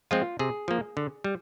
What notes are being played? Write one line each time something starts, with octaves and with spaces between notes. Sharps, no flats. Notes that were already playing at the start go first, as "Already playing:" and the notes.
F3 G#3 C4 F4
C3 G#4
F3 A#3
D3
G3